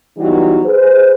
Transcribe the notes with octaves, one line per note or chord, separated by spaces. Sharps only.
E3 F#3 G3 B3 D#4 F4
G#4 B4 C5